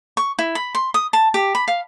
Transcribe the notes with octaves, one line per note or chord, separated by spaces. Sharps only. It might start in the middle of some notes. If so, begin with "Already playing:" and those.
C#6
E4
B5
C6
D#6
A5
G4
B5
F5